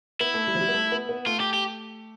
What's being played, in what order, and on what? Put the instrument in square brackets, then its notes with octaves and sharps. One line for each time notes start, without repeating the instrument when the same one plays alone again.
[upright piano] B3 [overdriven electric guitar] E4
[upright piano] A3
G3
F3
G3
B3
A3
B3
B3
[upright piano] A3 [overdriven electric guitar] F4
[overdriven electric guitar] G4
G4